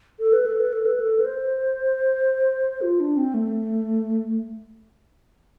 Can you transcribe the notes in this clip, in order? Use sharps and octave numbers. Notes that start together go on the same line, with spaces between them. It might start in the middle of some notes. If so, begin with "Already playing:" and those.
A4
B4
A4
B4
A4
B4
A4
B4
C5
F4
D4
C4
A3